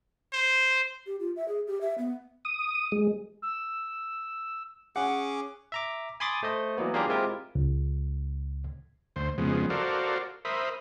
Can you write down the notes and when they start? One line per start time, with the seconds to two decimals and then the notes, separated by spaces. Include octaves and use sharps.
0.33 C5
1.06 G4
1.20 F4
1.36 E5
1.48 G#4
1.67 G4
1.81 E5
1.98 B3
2.45 D#6
2.92 G#3
3.42 E6
4.96 C#4 G#4 F#5 D6
5.72 E5 A#5 D6
6.20 G#5 B5 C6 D6 D#6 A6
6.43 A3 C5 D#5
6.78 E3 F#3 A#3 B3
6.94 A#3 D4 F4 G4 G#4 A#4
7.08 G#3 C4 E4 F4 G4 A#4
7.55 C#2
9.16 D2 C5
9.38 F2 C#3 F3 G#3 B3
9.70 F#4 A4 A#4 C5 D5 F5
10.45 A#4 C5 E5 B5 D#6